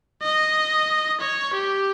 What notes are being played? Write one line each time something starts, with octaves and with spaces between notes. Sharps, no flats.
D#5
C#5
G4